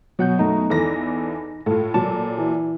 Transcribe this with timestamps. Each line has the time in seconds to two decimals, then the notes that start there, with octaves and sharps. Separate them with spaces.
0.19 B2 F#3 F#5 G6
0.39 F#2 A3 D#4 A#5
0.70 E2 E3 A4 A#6
1.66 A2 F4 A4
1.94 A#2 F#3 A5
2.38 E3